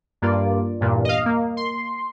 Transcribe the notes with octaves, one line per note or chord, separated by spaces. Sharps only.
G2 A#3 F4 D5
E2 G2 A#2
D#5 F5
A#3
C6